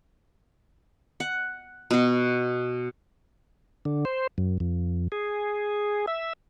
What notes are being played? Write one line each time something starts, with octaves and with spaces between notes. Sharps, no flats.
F#5
B2 F#4
D3
C5
F#2
F2
G#4
E5